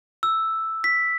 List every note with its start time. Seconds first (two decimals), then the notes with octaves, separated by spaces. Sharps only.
0.23 E6
0.84 B6